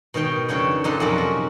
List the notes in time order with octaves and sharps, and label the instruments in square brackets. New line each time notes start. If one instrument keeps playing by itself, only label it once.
[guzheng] B2 D#3 C#5 G5
F2 C#3 D4 C#5 G5
A#2 D#4 A4 F#5
F2 C3 F#3 C#4 A#4 F#5
F#4